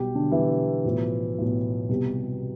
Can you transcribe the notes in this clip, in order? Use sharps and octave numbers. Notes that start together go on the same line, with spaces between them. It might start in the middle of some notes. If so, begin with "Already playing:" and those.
Already playing: B1 B2 G3 G4
D3 D4
B1 B2 E3 G3 E4
B1 A2 F3
B1 A2 F3
C2 B2 G3